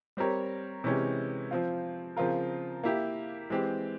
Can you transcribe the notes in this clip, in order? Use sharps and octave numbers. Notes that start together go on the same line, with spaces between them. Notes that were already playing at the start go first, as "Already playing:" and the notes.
G3 C4 G4 A#4 C#5
C3 E3 G#3 C#4 G4
F3 C4 F4
C#3 F3 C4 F4 A#4
A#3 E4 G4
E3 G#3 C4 G4